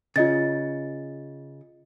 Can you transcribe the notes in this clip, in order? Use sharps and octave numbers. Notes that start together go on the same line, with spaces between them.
C#3 F4 D#5 A6